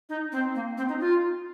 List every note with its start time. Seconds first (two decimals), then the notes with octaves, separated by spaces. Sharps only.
0.09 D#4
0.32 C4
0.55 A#3
0.77 C4
0.89 D#4
1.00 F4